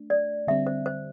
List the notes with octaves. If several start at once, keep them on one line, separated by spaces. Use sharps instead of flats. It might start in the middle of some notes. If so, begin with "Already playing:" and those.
Already playing: A3 D4
D5
D3 G3 C4 E5
C5
C5